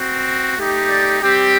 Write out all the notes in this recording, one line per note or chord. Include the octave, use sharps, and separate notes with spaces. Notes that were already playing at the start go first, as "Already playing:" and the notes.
Already playing: C4 F#4
A3 D#4 G4
D5
G3 C4 G4